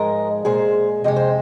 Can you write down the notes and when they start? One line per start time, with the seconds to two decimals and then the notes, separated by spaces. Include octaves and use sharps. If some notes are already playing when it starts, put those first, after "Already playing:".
Already playing: G#2 F3 G#3 A#4 D#5
0.45 A#2 G#3 G#4 C5
1.04 F2 C3 G#3 D#5
1.16 C5